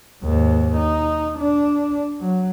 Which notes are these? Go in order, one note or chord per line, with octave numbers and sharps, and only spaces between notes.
D#2 G#2
D#4
D4
F#3